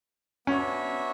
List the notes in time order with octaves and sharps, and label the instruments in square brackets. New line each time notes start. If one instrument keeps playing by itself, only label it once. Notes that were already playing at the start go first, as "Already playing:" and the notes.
[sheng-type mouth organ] B3 D4 F#4 C#5 E5 [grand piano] C#4